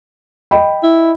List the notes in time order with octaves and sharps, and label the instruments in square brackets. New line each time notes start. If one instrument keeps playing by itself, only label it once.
[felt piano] D#5 G5 B5
[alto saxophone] E4